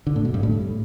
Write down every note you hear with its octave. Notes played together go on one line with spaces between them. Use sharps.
D3
A2
B2
G2
A2